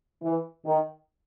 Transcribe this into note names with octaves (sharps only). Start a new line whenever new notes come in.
E3
D#3